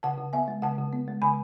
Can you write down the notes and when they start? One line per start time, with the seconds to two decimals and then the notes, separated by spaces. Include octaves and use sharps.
0.03 C#3 F#5 A5
0.18 C#3
0.33 B3 E5 G#5
0.48 G#3
0.62 C#3 F#5 A5
0.78 C#3
0.93 B3
1.08 G#3
1.22 C#3 G#5 B5